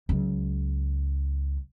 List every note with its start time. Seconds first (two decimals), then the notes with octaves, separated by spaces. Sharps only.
0.09 C#2 F#3